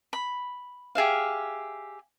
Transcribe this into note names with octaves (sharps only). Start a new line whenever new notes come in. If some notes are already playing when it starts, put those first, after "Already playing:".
B5
G4 G#4 E5 F5